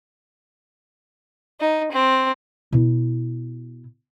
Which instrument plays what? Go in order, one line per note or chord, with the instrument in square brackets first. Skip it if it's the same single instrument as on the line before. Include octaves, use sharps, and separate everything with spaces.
[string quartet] D#4
C4
[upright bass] B2 E4